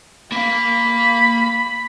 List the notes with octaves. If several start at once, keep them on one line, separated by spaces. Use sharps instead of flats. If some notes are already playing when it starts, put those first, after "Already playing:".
A#3 F5 B5